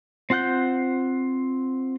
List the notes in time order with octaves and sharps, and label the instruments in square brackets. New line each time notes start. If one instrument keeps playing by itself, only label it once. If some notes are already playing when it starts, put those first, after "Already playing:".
[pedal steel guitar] C4 F4 F#5 F#6 G6